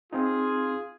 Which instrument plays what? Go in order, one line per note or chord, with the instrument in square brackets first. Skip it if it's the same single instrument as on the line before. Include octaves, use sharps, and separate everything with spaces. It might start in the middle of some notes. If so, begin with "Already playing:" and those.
[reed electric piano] C4 D#4 [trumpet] F4 [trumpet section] G#4